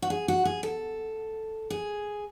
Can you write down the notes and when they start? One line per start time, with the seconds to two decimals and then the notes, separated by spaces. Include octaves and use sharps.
0.02 F#4
0.10 G#4
0.28 F#4
0.45 G#4
0.63 A4
1.70 G#4